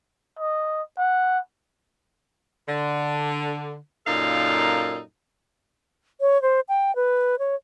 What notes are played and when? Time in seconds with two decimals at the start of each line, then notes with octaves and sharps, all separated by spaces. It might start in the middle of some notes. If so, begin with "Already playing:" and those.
0.39 D#5
0.98 F#5
2.68 D3
4.07 F#2 A#2 D#4 A4 F5
6.21 C#5
6.42 C5
6.69 G5
6.96 B4
7.39 C#5